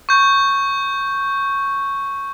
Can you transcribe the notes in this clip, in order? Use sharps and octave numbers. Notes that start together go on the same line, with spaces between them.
C#6 G6